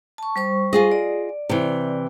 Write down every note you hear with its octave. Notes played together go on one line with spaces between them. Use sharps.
A5 C#6
G3 C5 C#6
F4 G#4 D#5
D5
C3 E3